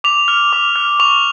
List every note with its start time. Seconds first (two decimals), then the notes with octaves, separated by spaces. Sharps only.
0.04 D6 F7
0.28 F6
0.53 D6
0.76 F6
1.00 C#6 F7